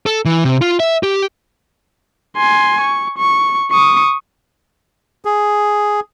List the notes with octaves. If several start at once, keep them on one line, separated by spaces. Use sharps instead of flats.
A4
E3
C3
F4
E5
G4
G#5 C6
C#6
C#6
C#6 D#6
G#4